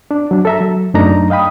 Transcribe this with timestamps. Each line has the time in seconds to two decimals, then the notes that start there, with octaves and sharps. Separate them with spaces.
0.11 D4
0.31 F#3 D4
0.45 A4 E5 A#5
0.60 F#3
0.94 F#2 A3 D4 D#4 A#5
1.30 D#5 F5 G5 B5 D#6